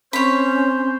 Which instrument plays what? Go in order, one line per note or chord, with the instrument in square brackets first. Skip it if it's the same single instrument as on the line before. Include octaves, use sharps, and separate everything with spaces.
[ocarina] C4 [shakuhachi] C#4 [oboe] C5 [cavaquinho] C#5 B5